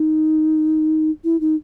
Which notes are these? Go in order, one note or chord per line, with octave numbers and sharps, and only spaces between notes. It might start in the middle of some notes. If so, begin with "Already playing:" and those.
Already playing: D#4
E4
D#4